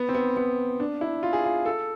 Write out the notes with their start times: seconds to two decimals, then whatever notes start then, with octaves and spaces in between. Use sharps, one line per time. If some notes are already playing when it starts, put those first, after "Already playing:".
Already playing: B3
0.09 C4
0.14 B3
0.37 B3
0.80 D4
1.01 E4
1.23 F4
1.33 G#4
1.44 F4
1.66 A4